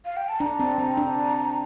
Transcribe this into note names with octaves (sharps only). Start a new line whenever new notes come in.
F5
G5
A5
D4 A#5
C4 A#5
C4 A#5
D4